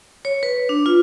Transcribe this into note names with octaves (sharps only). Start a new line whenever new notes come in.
C#5
B4
D4
F4